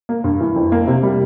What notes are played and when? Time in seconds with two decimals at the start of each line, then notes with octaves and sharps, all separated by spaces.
0.09 A#3
0.24 G2
0.41 E3
0.56 F2
0.72 A#3
0.87 C3
1.03 G3